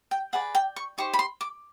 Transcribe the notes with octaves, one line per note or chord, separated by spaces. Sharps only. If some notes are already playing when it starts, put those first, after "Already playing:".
G5
G#4 B4 D5 F#5
G5
C#6
D#4 G4 C5 C#6
B5
C6
D6